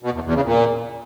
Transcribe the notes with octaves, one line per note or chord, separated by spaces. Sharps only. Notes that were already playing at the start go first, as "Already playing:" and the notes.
B2
E2
E2
C#3
A#2